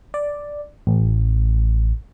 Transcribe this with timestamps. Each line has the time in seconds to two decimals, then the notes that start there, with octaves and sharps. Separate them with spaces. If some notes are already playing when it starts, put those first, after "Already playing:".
0.14 D5
0.87 A1